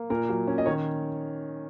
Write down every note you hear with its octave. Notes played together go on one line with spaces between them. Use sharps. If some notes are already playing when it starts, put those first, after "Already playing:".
Already playing: A#3
A#2 A#4
F#3
C#4
D#5
D#3 C#5